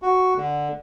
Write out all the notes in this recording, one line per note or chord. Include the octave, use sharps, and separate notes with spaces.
F#4
D3